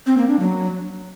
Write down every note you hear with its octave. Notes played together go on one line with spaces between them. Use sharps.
C4
A#3
D4
F#3